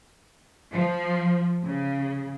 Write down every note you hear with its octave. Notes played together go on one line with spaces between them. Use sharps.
F3
C#3